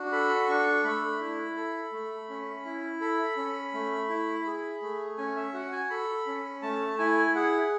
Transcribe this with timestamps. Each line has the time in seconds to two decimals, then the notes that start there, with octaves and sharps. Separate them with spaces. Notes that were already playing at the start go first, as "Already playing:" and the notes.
Already playing: D4 F#4
0.12 A4 B5
0.48 D4 C#6
0.84 A3 B5
1.21 E4
1.56 A4
1.93 A3
2.30 C#4
2.65 E4
3.01 A4 B5
3.37 C#4
3.74 A3
4.09 E4
4.46 G#4
4.82 A3
5.18 C#4 G#5
5.37 E5
5.54 F#4 F#5
5.72 G#5
5.90 A4 B5
6.27 C#4
6.62 A3 A5
6.98 E4 G#5
7.35 G#4 F#5